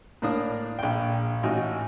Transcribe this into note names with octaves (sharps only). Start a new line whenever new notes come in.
A2 A#3 D4 D#6
A#1 G5
A1 D#4 F#4